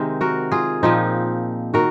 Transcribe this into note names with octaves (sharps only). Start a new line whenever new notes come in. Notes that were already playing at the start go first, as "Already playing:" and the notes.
Already playing: C3 D#3 G#3 C4
F#4 A#4
F4 G#4
A#2 F3 C4 D#4
D#3 F#4 A#4